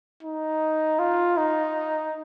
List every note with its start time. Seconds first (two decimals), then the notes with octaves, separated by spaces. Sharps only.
0.23 D#4
0.99 F4
1.38 D#4